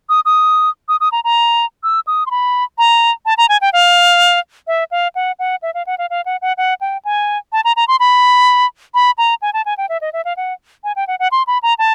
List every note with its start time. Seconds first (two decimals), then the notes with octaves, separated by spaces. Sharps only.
0.09 D#6
0.25 D#6
0.89 D#6
1.00 D#6
1.12 A#5
1.24 A#5
1.83 E6
2.07 D#6
2.26 C6
2.31 B5
2.78 A#5
3.26 A5
3.38 A#5
3.49 G#5
3.61 G5
3.73 F5
4.67 E5
4.91 F5
5.15 F#5
5.39 F#5
5.62 E5
5.74 F5
5.87 F#5
5.98 F5
6.10 F5
6.26 F#5
6.42 F#5
6.57 F#5
6.81 G5
7.05 G#5
7.52 A5
7.65 A#5
7.76 A#5
7.88 C6
8.00 B5
8.94 B5
9.18 A#5
9.42 G#5
9.54 A5
9.66 G#5
9.78 G5
9.89 E5
10.01 D#5
10.13 E5
10.25 F5
10.37 F#5
10.84 G#5
10.96 G5
11.08 F#5
11.20 F#5
11.32 C6
11.47 B5
11.63 A#5
11.79 A5